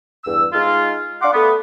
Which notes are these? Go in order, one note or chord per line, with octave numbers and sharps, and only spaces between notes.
E2 G2 E6
G#3 D#4 F4
D4 F5 F#5 C6 D6
A3 B3